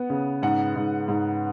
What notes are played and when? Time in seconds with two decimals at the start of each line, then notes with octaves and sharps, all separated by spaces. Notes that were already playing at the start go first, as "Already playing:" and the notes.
Already playing: B3 F#5
0.10 C#3
0.42 G#2 F#5
0.76 G#2
1.08 G#2